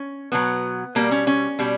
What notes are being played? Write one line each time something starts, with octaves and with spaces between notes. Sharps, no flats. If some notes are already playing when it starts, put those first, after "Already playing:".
Already playing: C#4
B2 F#3 B3
B2 G3 A#3
C#4
C#4
B2 G3